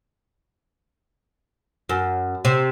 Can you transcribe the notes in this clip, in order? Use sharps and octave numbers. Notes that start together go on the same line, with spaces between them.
F#2
C3